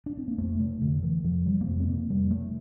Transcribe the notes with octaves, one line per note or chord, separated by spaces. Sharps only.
D4
C4
A#3
F2 A3
C3 A3
F2 D3
C3 E3
F2 F3
C3 G3
A#3
F2 A3
C4
C3 A#3
F2 G3
C3 A3